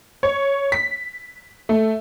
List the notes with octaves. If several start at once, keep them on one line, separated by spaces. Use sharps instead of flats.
C#5
B6
A3